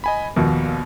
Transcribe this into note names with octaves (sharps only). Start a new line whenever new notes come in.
D#5 G#5 B5
A#1 D#2 B2